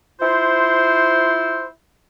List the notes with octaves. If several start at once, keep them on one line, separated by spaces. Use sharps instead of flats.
E4 F4 C5